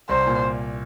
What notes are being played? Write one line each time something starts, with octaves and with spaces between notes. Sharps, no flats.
C2 C5
A#2